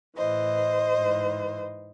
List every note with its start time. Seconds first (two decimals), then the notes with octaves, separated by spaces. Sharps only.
0.16 A2 E3 C5 D#5
0.95 G#2 E3